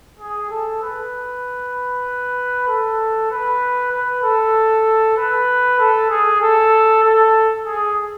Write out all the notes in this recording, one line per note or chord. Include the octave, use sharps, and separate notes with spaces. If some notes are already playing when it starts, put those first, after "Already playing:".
G#4
A4
B4
A4
B4
B4
A4
B4
A4
G#4
A4
A4
G#4